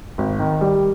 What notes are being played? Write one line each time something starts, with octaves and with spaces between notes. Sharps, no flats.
G#1
D#3
G3